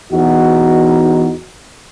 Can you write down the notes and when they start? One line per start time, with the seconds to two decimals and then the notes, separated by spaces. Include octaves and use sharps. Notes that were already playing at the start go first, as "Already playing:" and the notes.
0.11 E2 D#4 F#4